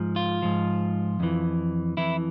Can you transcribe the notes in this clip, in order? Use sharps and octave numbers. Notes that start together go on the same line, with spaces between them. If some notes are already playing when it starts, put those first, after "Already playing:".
Already playing: G#2 F3
F4
G#2 F3
F2 E3
F2 E3 E4